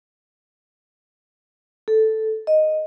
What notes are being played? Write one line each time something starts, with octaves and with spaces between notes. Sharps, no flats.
A4
D#5